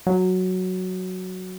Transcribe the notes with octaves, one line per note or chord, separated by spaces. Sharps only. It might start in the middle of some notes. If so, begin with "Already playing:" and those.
F#3